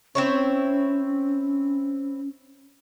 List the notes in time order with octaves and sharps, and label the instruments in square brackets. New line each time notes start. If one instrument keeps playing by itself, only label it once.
[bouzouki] C4 E4 C#5 [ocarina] C#4